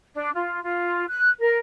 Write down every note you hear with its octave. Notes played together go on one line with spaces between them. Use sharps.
D4
F4
F4
F#6
A#4